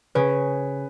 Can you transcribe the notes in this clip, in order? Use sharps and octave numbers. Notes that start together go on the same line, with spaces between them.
C#3 B4